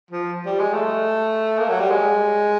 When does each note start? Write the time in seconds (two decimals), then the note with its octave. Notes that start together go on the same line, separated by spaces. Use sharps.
0.11 F3
0.46 G3
0.59 G#3
0.74 A3
1.59 A#3
1.69 F#3
1.80 G3
1.90 G#3